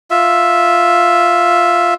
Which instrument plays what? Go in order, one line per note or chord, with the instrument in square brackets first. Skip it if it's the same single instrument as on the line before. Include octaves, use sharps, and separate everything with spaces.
[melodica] F4 E5